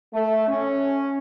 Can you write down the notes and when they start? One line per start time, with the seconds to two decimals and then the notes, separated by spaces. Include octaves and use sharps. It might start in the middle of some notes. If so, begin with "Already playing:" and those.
0.13 A3
0.48 C#4